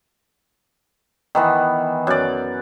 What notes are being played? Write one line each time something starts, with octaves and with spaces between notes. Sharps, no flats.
D#3 E3 B3
F#2 D5